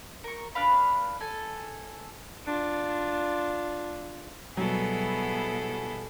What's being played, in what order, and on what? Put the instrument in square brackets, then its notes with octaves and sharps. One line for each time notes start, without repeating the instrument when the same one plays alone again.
[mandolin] A#4 C#6
D4 B4 F5 B5
A4 G#5
[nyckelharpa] D4 F4
[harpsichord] B2 G3 [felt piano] F#3 [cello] B3 G#4 [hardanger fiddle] E4 A4